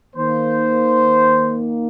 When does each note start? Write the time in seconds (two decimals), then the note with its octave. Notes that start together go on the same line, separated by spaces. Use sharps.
0.15 D#3 A#3 C5